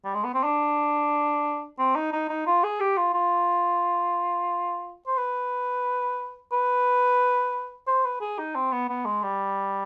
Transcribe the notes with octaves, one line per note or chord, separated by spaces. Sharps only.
G3
G#3
B3
C4
D4
C4
D#4
D#4
D#4
F4
G#4
G4
F4
F4
C5
B4
B4
C5
B4
G#4
D#4
C4
B3
B3
G#3
G3